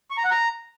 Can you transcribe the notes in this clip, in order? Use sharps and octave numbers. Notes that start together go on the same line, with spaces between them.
C#6
A#5
F#5
A#5